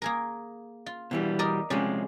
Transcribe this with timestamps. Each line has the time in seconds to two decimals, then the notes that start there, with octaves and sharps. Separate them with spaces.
0.02 A#3 G#4 A#4
0.86 F4
1.11 B2 E3 G3
1.39 A#4 D5 D#5
1.70 C3 F3 G#3 C#4 D5